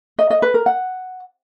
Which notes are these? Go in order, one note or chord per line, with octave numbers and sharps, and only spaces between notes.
D#5
D#5
B4
A#4
F#5